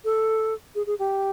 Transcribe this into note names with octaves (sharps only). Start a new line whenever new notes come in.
A4
G#4
G#4
G4